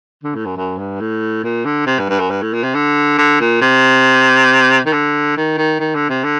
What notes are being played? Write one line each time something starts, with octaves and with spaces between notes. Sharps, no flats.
D3
A2
F#2
F#2
G2
A2
A#2
D3
C3
G2
G2
F#2
G2
A2
A#2
C3
D3
D3
A#2
C3
D#3
D3
D#3
D#3
D#3
D3
C3
D3